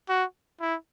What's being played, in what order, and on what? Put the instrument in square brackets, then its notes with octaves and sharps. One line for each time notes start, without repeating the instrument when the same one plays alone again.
[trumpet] F#4
E4